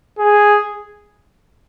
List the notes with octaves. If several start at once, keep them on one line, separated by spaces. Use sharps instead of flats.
G#4